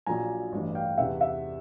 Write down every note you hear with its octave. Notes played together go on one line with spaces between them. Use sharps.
A#1 A#2 F#3 G#5 A#5
A1 G2 E3
F5 G5
E2 C3 E3 E5 F#5
E5 F#5